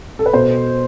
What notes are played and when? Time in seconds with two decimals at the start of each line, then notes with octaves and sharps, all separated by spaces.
0.19 A4
0.26 B4
0.33 B2 A4 C5